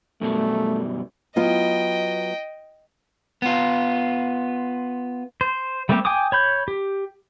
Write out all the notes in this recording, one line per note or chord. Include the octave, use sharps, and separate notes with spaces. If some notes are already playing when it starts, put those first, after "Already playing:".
F#2 B2 G3 A3
F#3 B3 F4 D#5 G5
B3 F4
C5
G3 A3 A#3 C4 G4
G5 G#5 D6 D#6
C#5 B5 G6
G4